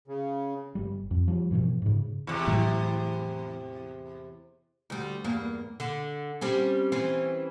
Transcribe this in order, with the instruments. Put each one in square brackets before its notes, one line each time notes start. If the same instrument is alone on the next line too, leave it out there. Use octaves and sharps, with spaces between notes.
[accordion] C#3
[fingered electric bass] G1 G3
F2
F3 G3
G2 B2 E3 F3
G#2 C#3
[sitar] E2 C3
[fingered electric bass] A2 E3 F#3
[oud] D2 G3
E2 G2 A#3
D3
G3 C4 C#4
E3 C4 C#4